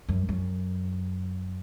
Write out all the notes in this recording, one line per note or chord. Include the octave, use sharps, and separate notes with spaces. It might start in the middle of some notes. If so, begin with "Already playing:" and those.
F#2
F#2